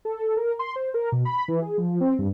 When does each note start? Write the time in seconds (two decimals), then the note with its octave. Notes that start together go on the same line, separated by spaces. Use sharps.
0.05 A4
0.37 A#4
0.59 C6
0.76 C5
0.94 A#4
1.12 B2
1.25 B5
1.48 E3
1.62 G#4
1.78 F3
2.00 C4
2.19 G2